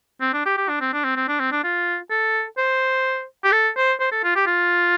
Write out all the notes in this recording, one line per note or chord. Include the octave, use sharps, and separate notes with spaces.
C4
D4
G4
G4
D4
C4
D4
C4
C4
D4
C4
D4
F4
A4
C5
G4
A4
C5
C5
A4
F4
G4
F4